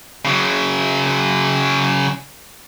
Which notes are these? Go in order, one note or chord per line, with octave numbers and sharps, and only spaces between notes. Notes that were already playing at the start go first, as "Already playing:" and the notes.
C#3 F#3